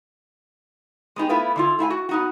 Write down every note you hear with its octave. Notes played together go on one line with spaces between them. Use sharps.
G#3 B3 D#4 G4
A3 B3 E4 F4 B4
D3 E4 F4
A3 E4 F5 G#5
F#4
B3 D#4 F#4